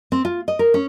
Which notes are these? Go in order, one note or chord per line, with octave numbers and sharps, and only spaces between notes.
C4
F4
D#5
A#4
C#4